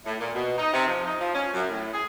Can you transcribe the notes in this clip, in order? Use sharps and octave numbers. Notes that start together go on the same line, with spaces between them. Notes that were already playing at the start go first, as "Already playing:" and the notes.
A2
A#2
B2
D#4
C3
F3
D#4
F3
C#4
F#2
A2
G#4